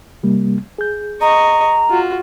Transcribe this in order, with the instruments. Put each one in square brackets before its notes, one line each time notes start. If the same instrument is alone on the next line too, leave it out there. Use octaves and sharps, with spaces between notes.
[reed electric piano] C3 G3 A#3
G#4 G6
[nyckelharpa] D#5 C#6 [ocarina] A#5
[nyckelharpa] F4 F#4